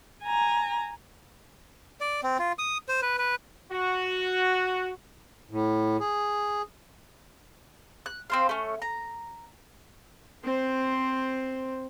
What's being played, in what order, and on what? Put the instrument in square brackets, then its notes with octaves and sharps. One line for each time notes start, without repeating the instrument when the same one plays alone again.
[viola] G#5 A#5
[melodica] D5
C4
F4
D#6
C5
B4
B4
[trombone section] F#4
[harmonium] A2
G#4
[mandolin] F#6
C4 C5 F5
A3 C#4
A#5
[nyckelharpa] C4 C5